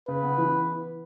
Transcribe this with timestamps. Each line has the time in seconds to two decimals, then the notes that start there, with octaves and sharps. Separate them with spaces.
0.08 C#3 B4
0.23 B3
0.38 E3